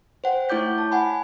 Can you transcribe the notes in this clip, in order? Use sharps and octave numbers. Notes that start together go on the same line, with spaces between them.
C5 F#5 G5
A3 E4 C#5 D6 G6 B6
A5
F#5 G#5 B5